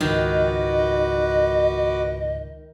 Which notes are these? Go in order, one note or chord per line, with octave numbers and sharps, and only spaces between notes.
C#2 G#2 D#3 F3 F#4 B4 D#5 D6